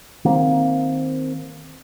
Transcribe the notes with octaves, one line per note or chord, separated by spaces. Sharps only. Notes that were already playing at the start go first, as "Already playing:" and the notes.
D#3 A#3 C4